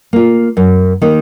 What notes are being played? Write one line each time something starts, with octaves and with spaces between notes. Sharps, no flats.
A#3 F4
F#2
D#3 A#3 D#4